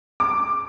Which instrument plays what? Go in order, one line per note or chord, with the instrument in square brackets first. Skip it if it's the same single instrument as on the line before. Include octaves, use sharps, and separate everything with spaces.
[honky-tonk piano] D6